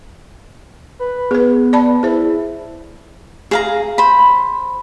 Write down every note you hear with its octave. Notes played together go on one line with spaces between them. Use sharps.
B4
B3 G#4 B4
D5 A5 B5
E4 G#4 C5
G#4 F5 A#5
C5 B5